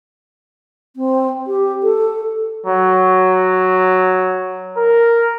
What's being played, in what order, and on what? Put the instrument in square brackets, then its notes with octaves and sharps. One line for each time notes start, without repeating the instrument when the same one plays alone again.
[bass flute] C4
G4
A4
[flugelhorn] F#3
A#4